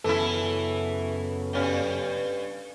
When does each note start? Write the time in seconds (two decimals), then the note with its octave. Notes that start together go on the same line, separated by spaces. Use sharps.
0.04 F#2 C#3 E3 B3 E4 A4
1.53 G2 C#4